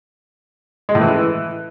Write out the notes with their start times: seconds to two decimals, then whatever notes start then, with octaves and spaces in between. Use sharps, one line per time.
0.89 G#3
0.95 A2
1.01 E3